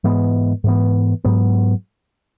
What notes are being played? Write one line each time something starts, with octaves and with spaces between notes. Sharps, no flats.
G#2 E3 G#3 B3
G#2 E3 B3
G#2 F#3 B3